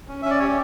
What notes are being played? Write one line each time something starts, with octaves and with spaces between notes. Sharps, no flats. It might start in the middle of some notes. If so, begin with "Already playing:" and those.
C#4
C#4 E5
D5
G4 C#5